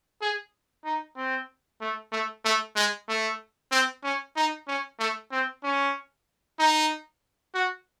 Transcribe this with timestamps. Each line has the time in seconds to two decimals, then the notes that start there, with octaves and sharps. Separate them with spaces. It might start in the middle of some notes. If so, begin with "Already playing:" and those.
0.22 G#4
0.85 D#4
1.17 C4
1.81 A3
2.12 A3
2.45 A3
2.76 G#3
3.09 A3
3.72 C4
4.04 C#4
4.36 D#4
4.68 C#4
4.99 A3
5.31 C4
5.63 C#4
6.59 D#4
7.54 F#4